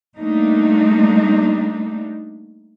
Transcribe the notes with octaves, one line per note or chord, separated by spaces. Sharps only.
G3 A3 A#3 D4 D#4